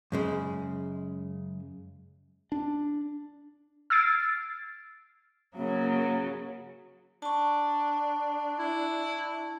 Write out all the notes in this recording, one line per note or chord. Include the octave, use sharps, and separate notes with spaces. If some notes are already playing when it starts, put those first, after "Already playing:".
F#2 C#3 G#3
D4
E6 F6 G#6 A6 C7 D7
C#3 F#3 A#3
D4 A5 C#6
E4